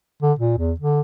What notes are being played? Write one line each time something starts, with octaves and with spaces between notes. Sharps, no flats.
D3
A#2
E2
D3